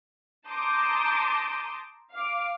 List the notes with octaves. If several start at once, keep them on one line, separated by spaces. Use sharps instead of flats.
A5 A#5 C6 D6 D#6 G6
F5 D6